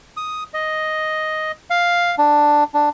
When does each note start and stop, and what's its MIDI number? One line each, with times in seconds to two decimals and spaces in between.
0.17 0.44 87
0.54 1.52 75
1.70 2.15 77
2.18 2.64 62
2.74 2.89 62